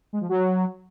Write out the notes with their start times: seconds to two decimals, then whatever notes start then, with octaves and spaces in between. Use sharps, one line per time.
0.13 G#3
0.21 F3
0.29 F#3